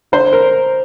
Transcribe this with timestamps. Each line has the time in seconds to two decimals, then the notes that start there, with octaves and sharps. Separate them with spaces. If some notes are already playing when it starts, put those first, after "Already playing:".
0.12 D3 C5
0.33 A#4